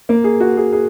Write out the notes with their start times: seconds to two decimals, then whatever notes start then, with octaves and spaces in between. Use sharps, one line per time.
0.09 A#3
0.24 G#4
0.40 F#4
0.57 G#4
0.73 G#4